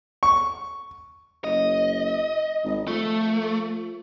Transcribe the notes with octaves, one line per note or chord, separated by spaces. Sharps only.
C#6
F#1 D#5
G#1
F3 A3